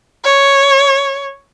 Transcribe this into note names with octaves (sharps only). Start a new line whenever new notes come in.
C#5